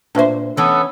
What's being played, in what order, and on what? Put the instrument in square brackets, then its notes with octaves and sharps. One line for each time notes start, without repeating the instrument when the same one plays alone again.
[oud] A#2 C5 [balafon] D4 B4 E5
[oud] E3 C#4 [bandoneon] B3 A4